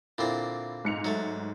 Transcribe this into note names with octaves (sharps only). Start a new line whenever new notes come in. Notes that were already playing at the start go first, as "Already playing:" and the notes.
A#2 D3 C4 E4
G#2 C#7 F7
F#3 A3